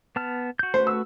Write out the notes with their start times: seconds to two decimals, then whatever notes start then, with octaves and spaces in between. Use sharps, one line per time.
0.16 B3 A5 F6
0.59 F#4 G6
0.74 A3 F#4 B4 C5
0.87 E6